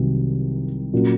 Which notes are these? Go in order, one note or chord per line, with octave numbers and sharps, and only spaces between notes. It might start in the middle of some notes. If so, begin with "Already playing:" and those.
Already playing: C2 C3 D#3 F#3 C4
A#2 F#3 A#3 C#4